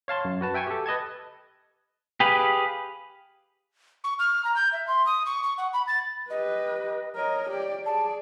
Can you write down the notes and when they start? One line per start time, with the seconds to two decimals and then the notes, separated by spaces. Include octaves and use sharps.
0.08 C#5 F5 A5 C6
0.25 F#2
0.41 F#4 B4 A5
0.54 E5 G5 G#5 C#6
0.67 G4 A4
0.86 B4 D#5 A5 G#6
2.20 G4 G#4 B4 F5
4.04 C#6
4.19 F6
4.45 A#5
4.56 G6
4.73 E5
4.88 C6
5.06 D#6
5.26 C#6
5.43 C#6
5.58 F#5
5.73 B5
5.88 A6
6.30 G4 B4 D#5
7.16 A#4 C#5 D#5
7.50 G4 D5
7.86 G#4 D5 A5